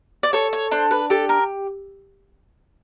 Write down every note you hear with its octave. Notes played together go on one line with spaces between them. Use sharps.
D5
A4 C#5
C#5
D4 C5
B4
G4 A4
A#4